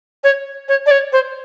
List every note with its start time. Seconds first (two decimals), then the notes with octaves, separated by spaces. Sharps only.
0.24 C#5
0.68 C#5
0.86 D5
0.91 C#5
1.12 C5